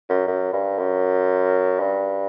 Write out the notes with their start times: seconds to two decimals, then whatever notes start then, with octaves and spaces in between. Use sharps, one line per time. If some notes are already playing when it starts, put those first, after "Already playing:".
0.10 F#2
0.27 F#2
0.53 G2
0.79 F#2
1.80 G2